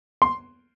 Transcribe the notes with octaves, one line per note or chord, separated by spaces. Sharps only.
C6